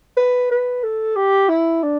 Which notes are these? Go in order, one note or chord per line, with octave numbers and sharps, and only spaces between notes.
B4
B4
A4
G4
E4
D4